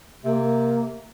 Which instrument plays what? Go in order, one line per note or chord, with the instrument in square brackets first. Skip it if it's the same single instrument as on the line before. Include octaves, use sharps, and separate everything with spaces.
[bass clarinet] C3 [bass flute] A#3